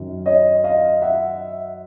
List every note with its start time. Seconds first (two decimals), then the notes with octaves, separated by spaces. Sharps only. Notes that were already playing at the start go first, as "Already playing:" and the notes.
Already playing: F#2 D#3
0.26 C#5 D#5
0.64 D#5 F5
1.02 E5 F#5